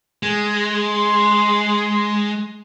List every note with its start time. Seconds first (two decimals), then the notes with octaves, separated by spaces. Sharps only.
0.23 G#3
0.87 C6